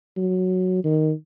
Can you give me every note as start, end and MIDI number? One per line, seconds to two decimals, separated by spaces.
0.17 0.84 54
0.84 1.12 51